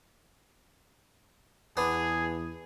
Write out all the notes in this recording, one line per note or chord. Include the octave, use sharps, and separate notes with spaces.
E2 B3 D4 G#4